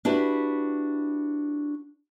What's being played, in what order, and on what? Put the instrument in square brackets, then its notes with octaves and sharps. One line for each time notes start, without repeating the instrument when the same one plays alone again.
[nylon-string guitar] D4 E4 F#4 G4 B4